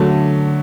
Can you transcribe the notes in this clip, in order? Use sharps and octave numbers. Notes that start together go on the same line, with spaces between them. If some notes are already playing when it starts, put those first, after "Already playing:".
Already playing: D3 F#3 A3